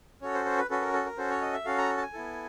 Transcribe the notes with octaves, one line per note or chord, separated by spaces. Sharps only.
C#4 F#4 A4 C#5
C5
C5
B4
C#4 F#4 A4 B4
A#4
A4
A#4
C#4 F#4 A4 C5
C#5
D#5
E5
C#4 F#4 A4 F5
A#5
A5
G#5
B3 E4 A4